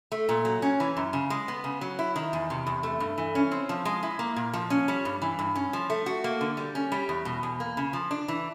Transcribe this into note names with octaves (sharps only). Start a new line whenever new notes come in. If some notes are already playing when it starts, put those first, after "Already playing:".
A3
A#2
F#3
C#4
E3
F#2
C#3
G#3
B3
C#3
F#3
E4
D#3
E2
C3
E2
A3
G2
E3
C#4
C4
F3
G#3
E4
A#3
A#2
F3
C#4
G3
G2
E3
G2
C#4
F3
A3
F#4
A#3
D3
G3
C#4
G3
E2
B2
E2
A#3
C#3
F3
D4
E3